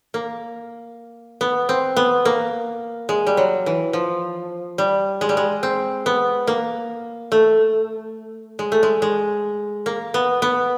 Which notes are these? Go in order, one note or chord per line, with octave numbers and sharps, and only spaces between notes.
A#3
B3
C4
B3
A#3
G#3
G3
F#3
E3
F3
G3
G#3
G3
G#3
C4
B3
A#3
A3
G#3
A3
G#3
G#3
A#3
B3
B3